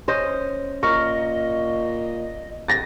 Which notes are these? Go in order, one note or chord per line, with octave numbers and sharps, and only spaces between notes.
C#4 C5 D#5
A#2 A#4 D#5 C#6
C3 A6 A#6